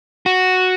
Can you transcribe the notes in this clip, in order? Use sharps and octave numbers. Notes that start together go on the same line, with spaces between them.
F#4